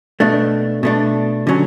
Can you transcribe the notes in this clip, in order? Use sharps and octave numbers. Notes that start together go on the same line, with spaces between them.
B2 A3 D4
B2 A3 D4
D3 F#3 C#4